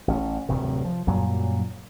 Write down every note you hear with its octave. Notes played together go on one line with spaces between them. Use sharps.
A1 C#4
D1 G2 C3 D#3
F3
F#2 A#2 F#3 G3